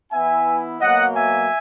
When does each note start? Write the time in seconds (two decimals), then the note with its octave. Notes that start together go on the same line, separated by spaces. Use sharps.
0.12 E3 B3 E4 E5 G#5
0.81 B2 F#3 A#3 D#5 F#5
1.15 E5 G#5